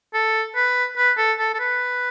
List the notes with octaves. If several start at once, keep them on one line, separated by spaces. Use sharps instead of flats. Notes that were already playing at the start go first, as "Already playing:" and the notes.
A4
B4
B4
A4
A4
A4
B4